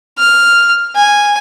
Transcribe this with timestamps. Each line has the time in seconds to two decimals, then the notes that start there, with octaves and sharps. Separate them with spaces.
0.19 F6
0.96 G#5